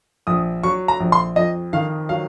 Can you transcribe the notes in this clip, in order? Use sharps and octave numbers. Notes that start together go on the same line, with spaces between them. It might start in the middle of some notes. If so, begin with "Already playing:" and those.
A#1 D#6
F#3 C#6
A#5
A#1
C6
F2 D#5
D#3 F5
F#3 F5